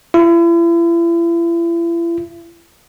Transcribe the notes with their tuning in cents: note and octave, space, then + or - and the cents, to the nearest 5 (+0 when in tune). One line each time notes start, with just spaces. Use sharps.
E4 +40